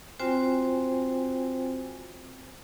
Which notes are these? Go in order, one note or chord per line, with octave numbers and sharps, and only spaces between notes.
C4 F4 F#4 C5 G5 G#5